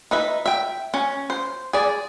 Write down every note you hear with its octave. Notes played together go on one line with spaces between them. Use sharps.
D#4 B4 E5
E5 G5
C#4
C5
G#4 D5